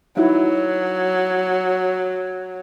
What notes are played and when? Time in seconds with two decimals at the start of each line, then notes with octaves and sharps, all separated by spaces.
0.17 F#3 D#4 E4 F#4